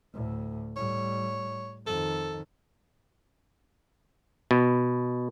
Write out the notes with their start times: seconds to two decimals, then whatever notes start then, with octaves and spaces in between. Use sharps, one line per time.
0.14 D2 A2
0.76 A2 G3 C#5
1.86 F2 D#3 A4
4.51 B2